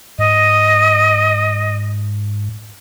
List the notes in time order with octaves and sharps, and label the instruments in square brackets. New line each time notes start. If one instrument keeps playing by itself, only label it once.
[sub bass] G#2 [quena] D#5